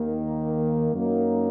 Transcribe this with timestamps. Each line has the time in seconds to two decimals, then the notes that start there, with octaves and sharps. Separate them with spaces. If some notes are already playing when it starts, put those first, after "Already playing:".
Already playing: D#2 D#3 A#3 D#4
0.92 F#2 F#3 A#3 D#4